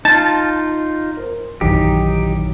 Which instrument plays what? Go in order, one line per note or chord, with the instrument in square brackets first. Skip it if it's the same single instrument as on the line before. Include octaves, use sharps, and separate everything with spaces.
[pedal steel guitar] D#4 F4 [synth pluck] A5 A6
[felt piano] A#4 C5
[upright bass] A#1 F#2 [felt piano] D#3 E3 F#3 [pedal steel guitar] D#4 G4